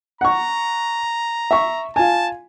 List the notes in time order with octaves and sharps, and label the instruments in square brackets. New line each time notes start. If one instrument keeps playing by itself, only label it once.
[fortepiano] F#5 C#6 [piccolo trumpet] A#5
[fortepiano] E5 C#6
[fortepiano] F4 G#5 [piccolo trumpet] A5